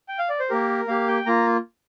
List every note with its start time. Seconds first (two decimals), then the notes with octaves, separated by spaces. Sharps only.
0.09 G5
0.19 F5
0.29 D5
0.40 C5
0.50 A#3 G4 A#4
0.88 A#3 G4 F5
1.08 G5
1.26 A#3 F4 A#5